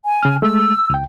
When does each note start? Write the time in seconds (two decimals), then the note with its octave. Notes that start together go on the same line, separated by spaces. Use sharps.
0.05 G#5
0.23 C#3 F6
0.42 G#3 A3 E6
0.90 C#2 G5